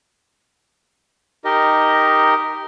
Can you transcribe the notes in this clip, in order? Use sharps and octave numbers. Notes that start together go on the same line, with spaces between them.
D#4 G4 A#4 D#5